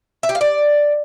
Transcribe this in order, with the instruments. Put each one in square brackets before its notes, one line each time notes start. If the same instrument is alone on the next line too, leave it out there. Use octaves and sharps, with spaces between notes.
[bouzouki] E5
G4
F5
D5